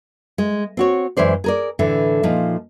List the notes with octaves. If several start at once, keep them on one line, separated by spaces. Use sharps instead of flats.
G#3
C4 F#4 C#5
F#2 E3 G#3 C5 D5
G#4 A#4 D5
A2 D3 E3
A#2 F3 D#4